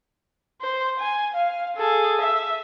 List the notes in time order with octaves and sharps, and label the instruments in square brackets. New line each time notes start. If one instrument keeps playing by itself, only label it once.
[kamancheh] C5
G#5
F5
G#4 A4
E5